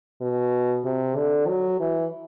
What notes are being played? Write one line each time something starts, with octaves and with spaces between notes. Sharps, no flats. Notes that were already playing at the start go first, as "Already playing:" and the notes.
B2
C3
D3
F#3
E3